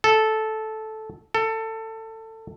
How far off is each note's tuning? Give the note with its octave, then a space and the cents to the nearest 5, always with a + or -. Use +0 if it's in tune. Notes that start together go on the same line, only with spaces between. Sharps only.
A4 -10
A4 +20